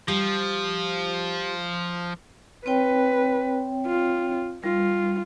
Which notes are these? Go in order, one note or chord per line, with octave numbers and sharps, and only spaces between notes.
F3 G3
C4 B4 C#5 G5
F4
G3 F4